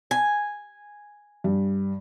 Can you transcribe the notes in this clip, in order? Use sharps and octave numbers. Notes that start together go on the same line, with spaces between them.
G#5
G2